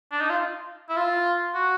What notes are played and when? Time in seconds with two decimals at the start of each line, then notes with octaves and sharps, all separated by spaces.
0.12 D4
0.20 D#4
0.30 F4
0.89 E4
0.97 F4
1.54 F#4